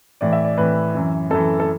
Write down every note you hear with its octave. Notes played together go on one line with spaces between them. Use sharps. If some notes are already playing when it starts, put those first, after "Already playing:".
A2 E3 D5
E5
D5
A2 E3 B4
F#2 E3
F#2 E3 A4
A4